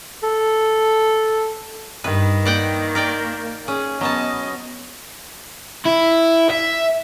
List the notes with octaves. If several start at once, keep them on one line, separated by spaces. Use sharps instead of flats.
A4
G2 D#3 B4
A#3 D5 F#5 G5
A#4 D5 G5
C#4 G#4
F#3 B3 C#4 D#5 A5
E4
E5